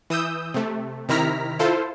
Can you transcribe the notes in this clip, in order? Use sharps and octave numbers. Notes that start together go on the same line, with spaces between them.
E3 D#6 E6 G6
C3 A3
C3 D#3 E4 A#5 F6 B6
E4 F4 A4 C5